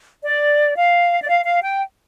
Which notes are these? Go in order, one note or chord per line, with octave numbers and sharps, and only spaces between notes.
D5
F5
D5
F5
F5
G5